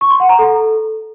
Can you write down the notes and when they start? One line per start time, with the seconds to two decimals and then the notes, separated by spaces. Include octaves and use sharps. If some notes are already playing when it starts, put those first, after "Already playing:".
0.01 C#6
0.11 C6
0.20 F#5
0.29 A#5
0.39 A4